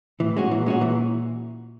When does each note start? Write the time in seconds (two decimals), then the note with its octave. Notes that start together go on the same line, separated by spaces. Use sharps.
0.20 A2 E3
0.37 G#3 C#4 F#4
0.51 A#2 E3
0.66 G#3 C#4 F#4
0.81 E3